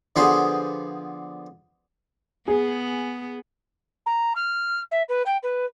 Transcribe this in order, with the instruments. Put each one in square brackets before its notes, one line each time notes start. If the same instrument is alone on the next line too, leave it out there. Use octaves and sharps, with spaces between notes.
[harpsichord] D3 F3 B3 G4 G#4 C5
[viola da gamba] B3 [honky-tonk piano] G#4
[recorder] A#5
F6
E5
B4
G5
B4